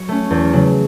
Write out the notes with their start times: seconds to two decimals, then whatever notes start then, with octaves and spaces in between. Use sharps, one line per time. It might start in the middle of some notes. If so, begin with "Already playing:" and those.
Already playing: F#3 C#5
0.09 A3 C#4
0.31 E2
0.53 C#3 F#3